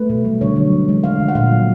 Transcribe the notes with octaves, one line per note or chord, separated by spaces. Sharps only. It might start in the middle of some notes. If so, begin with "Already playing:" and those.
Already playing: A3 B4
B2
G3
D3 C#5
F#3
E3
G#3
D3 F5
F3
F#5
A#2 F5
F#3